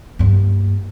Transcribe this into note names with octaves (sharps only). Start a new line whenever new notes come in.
G2 A#3